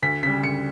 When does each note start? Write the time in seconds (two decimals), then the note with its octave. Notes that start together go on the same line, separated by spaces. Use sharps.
0.02 D2 B6
0.23 C#3 G3 B6
0.43 D2 C#7